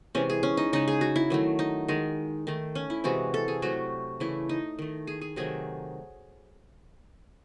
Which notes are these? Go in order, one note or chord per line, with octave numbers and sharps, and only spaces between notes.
C3 E3 G#3 C#4
G#4
C#4
D#4
C#3 G#3 D#4
G#4
F#4
E4
D#3 F#3 A3
D#4
D#3 G#3
D#3 A3
C#4
E4
C3 E3 G#3 F#4
A4
G#4
C3 F#3 A3 F#4
C#3 E3 A3 E4
D#4
D#3 A3
G#4
G#4
C3 D#3 F#3 A3 G#4